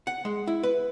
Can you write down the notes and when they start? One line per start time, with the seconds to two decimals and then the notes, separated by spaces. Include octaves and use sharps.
0.07 F#5
0.25 G#3
0.47 E4
0.63 B4